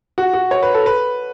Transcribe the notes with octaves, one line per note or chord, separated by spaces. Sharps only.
F#4
F#4
C#5
B4
A4
B4